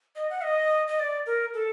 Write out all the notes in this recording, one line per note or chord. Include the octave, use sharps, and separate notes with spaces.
D#5
F#5
D#5
D#5
D5
A#4
A4